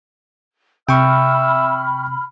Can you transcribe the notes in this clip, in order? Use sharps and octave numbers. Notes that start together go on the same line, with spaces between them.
C3 E5 G5 B5 C#6 F6